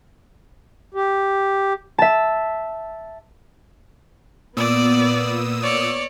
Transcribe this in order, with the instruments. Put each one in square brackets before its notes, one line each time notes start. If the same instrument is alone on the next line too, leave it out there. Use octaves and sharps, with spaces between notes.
[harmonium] G4
[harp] E5 A5
[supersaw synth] A#2 D#6 E6 [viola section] B3 [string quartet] D5
[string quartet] C#5 D5